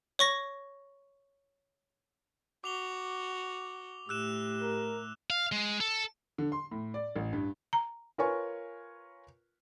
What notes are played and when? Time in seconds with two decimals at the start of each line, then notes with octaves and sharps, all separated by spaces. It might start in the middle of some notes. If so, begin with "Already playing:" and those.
0.19 C#5 C#6 A#6
2.64 F#4 D6 F7 G7
4.09 A2 G4 E6 F#6 E7
4.62 A#4
5.30 F5
5.52 G#3
5.80 A4
6.38 D3
6.52 C6
6.71 A2
6.94 D5
7.16 A1
7.33 G2
7.73 A#5
8.18 F4 A#4 B4 C#5 G#5 C#6